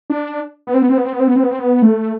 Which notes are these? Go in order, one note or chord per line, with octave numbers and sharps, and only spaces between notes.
D4
B3
C4
B3
C4
B3
C4
B3
C4
B3
C4
B3
C4
B3
A3